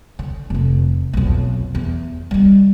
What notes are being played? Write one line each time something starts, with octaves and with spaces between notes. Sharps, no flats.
D3
F1 F2
B1 F2
E2
G3 D#4